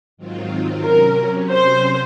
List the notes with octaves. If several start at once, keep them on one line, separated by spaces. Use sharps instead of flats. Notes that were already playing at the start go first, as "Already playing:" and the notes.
G#2 D#3 F#3 C4 F4
C3 F#3 C#4 A#4
C3 F#3 C#4 C5